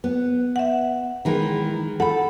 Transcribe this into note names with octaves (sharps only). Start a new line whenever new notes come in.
B3
E5 F#5
D#3 E3 G#3
A4 F#5 B5